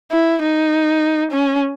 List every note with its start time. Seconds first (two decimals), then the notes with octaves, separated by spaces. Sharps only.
0.12 E4
0.42 D#4
1.31 C#4